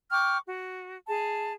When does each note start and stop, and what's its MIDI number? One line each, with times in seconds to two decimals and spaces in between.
0.11 0.38 79
0.11 0.38 85
0.11 0.38 86
0.11 0.38 89
0.46 0.97 66
1.07 1.53 68
1.07 1.53 81